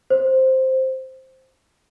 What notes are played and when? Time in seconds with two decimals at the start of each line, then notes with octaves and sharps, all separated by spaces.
0.10 C5